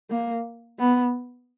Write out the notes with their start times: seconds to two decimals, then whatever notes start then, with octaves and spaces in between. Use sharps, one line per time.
0.10 A#3
0.79 B3